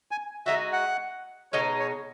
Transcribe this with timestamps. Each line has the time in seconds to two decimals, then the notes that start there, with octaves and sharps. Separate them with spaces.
0.11 G#5
0.46 G#3 D#4 F#4 E5
0.73 F#5
1.53 B2 G#3 D#4 C#5
1.79 C#5